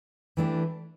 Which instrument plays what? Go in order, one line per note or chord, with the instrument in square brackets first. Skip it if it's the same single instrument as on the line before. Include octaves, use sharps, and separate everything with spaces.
[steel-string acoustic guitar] E3 A3 D4 G4